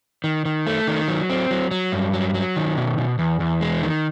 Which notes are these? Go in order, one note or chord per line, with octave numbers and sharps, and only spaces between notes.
D#3
D#3
A3
D#3
F#3
C4
F#3
F#3
G2
F#3
F#3
D#3
B2
B2
E2
E2
G#3
D#3